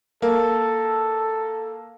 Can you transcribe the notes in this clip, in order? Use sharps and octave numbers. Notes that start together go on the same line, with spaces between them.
A#3 A4